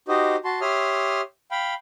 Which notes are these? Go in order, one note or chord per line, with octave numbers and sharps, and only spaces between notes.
D#4 F#4 G4 C5 D#5
F#4 A5 C6
G4 C#5 E5 C6 D#6 F6
F5 G5 B5